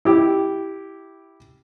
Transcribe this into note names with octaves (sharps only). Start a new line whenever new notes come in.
E4 G4